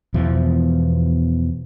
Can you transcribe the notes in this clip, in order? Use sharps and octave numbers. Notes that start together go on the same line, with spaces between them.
E2 B2 E3 F3